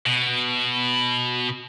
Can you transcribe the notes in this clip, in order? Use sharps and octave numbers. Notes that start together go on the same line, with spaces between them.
B2